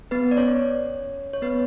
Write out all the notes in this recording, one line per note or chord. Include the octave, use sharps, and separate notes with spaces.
B3 B4
D5
C#4 C#5
C#5
B3 B4